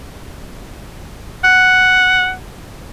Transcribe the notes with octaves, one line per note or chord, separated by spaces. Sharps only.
F#5